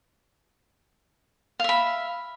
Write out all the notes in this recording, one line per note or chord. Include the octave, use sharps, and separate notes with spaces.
E5 F5 B5